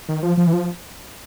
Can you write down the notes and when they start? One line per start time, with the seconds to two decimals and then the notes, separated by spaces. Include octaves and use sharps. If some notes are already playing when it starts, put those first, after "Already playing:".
0.09 D#3
0.23 F3
0.37 F3
0.47 E3
0.53 F3